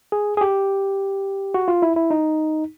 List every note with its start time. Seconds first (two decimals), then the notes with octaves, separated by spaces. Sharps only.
0.12 G#4
0.37 G#4
0.41 G4
1.54 F#4
1.68 F4
1.82 E4
1.96 E4
2.11 D#4